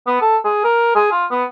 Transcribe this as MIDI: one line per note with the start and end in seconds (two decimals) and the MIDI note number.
0.07 0.18 59
0.21 0.37 69
0.45 0.60 68
0.64 0.91 70
0.96 1.07 68
1.12 1.25 65
1.31 1.44 59